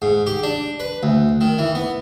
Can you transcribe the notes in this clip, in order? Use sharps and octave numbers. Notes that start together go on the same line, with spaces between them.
G#2
G4
D4
B4
D2
D#3
E3
B3